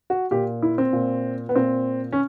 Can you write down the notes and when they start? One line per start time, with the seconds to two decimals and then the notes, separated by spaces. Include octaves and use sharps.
0.10 F#4
0.31 A#2 G4
0.62 E4
0.78 C4
0.93 A#2
1.49 B3
1.55 A#2 C4
2.13 C#4